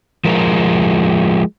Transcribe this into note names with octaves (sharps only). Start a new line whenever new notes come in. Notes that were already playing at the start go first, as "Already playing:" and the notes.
F3 G#3 A#4